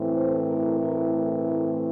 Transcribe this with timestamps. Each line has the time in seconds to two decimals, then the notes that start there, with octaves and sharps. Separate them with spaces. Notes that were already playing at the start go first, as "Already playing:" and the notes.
Already playing: A2 E3 A3 C4
0.14 C5
0.44 A#4
0.75 A#4
1.05 A#4
1.35 A#4